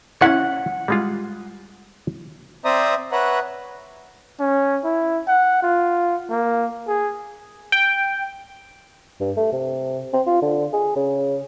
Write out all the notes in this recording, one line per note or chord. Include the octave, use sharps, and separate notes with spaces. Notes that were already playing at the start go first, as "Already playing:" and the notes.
C#4 E4 F#5
G3 G#3 F4
C4 C5 D5 E5 A#5 D#6
B4 C#5 E5 F#5 A#5
C#4
E4
F#5
F4
A#3
G#4
G5
G2
A3
C3
C4
F4
D3
G#4
C#3